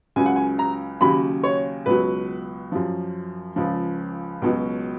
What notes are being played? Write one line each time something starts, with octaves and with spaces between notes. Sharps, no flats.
C#2 C#3 F#3 G#5
F#5
G#5
A#5
D#2 C#3 F#3 B5
C#5
C#2 B2 F#3 B4
F#2 F3
C#2 C#3 F3
C#2 B2 F#3